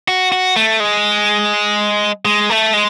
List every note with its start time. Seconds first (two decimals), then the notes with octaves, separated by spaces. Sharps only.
0.08 F#4
0.32 F#4
0.56 A3
0.80 G#3
2.25 G#3
2.50 A3
2.74 G#3